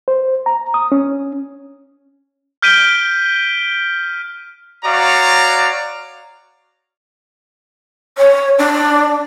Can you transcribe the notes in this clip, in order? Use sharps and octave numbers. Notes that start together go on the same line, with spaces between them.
C5
A#5
D#6
C#4
F6 G6 B6 D7 D#7 G7
F#4 C#5 D5 F5 A#5
C#5
D4